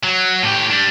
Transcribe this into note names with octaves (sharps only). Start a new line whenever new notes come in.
F#3
A2 G4
G3 D4